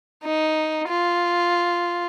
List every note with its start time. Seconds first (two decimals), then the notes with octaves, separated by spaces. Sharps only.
0.24 D#4
0.88 F4